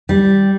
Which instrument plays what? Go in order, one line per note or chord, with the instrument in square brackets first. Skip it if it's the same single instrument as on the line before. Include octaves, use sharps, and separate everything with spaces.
[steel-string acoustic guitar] G3